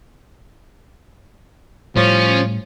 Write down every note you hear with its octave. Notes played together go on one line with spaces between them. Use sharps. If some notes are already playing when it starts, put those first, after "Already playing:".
A2 F3 G3 C#4